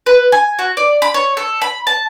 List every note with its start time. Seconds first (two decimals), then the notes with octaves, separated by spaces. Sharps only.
0.06 B4
0.32 G#5
0.59 F#4
0.77 D5
1.02 B5
1.14 C#5
1.37 A4
1.62 B5
1.87 A5